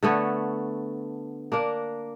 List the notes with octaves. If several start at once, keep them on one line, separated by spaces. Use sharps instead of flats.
D3 A3 B3 C#5
A#3 D4 A#4